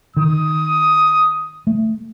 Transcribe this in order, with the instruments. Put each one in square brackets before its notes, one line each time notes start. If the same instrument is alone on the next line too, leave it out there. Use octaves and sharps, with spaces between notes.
[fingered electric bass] D#3 [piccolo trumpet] D#6
[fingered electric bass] A3